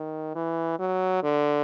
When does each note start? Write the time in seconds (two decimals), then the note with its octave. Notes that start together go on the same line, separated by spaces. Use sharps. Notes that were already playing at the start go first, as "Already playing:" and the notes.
Already playing: D#3
0.35 E3
0.79 F#3
1.24 D3